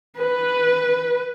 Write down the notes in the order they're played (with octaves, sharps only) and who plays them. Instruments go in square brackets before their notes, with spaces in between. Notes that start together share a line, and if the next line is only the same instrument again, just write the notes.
[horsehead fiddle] B4